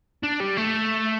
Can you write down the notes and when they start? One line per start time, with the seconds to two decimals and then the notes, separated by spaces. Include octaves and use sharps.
0.23 D4
0.40 G3
0.57 A3